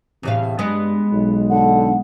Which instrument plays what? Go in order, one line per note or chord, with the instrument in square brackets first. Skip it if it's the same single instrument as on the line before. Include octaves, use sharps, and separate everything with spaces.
[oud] E2 A2 F5 [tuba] C3
[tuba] G2 [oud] G#3 B3
[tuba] B1
[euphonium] D3 [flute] F#5